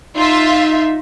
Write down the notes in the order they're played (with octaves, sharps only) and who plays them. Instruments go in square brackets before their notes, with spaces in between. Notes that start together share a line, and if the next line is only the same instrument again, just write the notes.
[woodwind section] D#4 [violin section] F4 E5